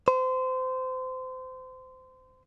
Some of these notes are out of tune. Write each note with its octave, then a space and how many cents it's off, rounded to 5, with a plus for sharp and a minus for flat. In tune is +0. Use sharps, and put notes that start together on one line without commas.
C5 -25